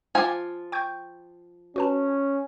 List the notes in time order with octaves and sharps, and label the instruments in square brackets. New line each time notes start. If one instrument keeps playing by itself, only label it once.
[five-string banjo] F3 F4 G#5 [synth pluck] F5 D6
[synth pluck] G5 C#6 G6
[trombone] C#4 [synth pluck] F#4 B4 A5